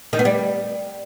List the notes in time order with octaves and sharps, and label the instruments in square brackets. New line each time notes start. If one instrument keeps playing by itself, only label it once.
[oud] D#3
B3
G3